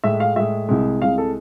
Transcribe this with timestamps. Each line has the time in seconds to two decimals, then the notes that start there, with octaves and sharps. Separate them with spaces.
0.04 A2 G#3 E5
0.20 F5
0.36 A2 G#3 E5
0.69 C2 C3 G#3
1.02 C2 C3 G#3 F5
1.18 A4